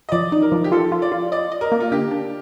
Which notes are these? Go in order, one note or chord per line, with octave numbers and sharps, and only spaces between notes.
D#5
F3 D5
D#4
A#4
F3
G4
F4 A4
F4
D5
F4
D5 D#5
D#5
A#4
A#3
F4
D3 G4
D4